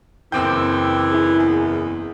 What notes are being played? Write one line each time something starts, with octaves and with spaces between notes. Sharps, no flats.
F#1 E3 C4 G5 D6 E6 G6
E4 G#4
E2